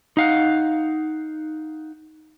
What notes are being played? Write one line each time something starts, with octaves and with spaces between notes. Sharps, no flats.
D#4 F5 F#5